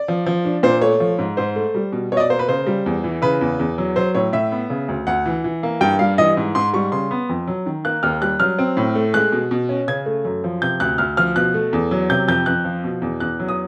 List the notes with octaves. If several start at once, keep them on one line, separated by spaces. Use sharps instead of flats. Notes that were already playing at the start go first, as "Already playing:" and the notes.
Already playing: D5
F3
F3
D4
A#2 C5
A3 C#5
F3
G#2
G#2 C5
A3
G3
B2
B2 C#5
D#5
D5
A#3 C5
B4
C#3 C5
G3
E2
E3
C#3 B4
E2
E2
F#3
F#3 C5
A2 C#5
A2 E5
B3
C#3
D2
D2 F#5
E3
E3
A#3
G2 G5
G3 F5
E3 D#5
G#2
G#2 C6
G3 C#6
C#3 C6
B3
F2
F#3
D#3
A#3 F#6
D#2 F6
G3 F#6
F#3 F6
C4
A2
A3
G#3 F#6
B2
B2
C#4
C#3 G#6
A3
F#2
F3
C3 G6
D2 F#6
D2 F6
F3 F6
B2 F#6
A3
E2
F#3
C3 G6
F2 G6
F2 F#6
F3
B2
E2
E2 F#6
F#3
D#6